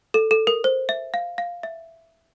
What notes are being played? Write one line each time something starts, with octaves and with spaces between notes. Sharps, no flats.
A4
A4
A#4
C5
E5
F5
F5
E5